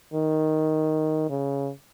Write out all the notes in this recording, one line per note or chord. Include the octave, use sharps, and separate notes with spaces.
D#3
C#3